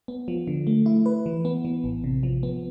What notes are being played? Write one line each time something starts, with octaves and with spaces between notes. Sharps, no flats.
B3
F3
D3
A3
E4
B4
E3
B3
E3
A1
C3
F3
B3